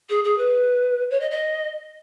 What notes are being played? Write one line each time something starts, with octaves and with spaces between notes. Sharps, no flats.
G#4
G#4
B4
C#5
D#5
D#5